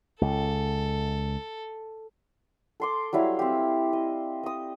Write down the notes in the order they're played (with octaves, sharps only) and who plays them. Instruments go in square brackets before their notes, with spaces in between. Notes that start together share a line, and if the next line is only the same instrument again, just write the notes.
[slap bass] C#2 [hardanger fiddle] A4
[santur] A4 C6 D6
F#3 G3 E4 F5
C4 G4
D#5
D#5 D#6